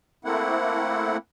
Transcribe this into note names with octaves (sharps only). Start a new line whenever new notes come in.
A3 A#3 C4 E4 F#5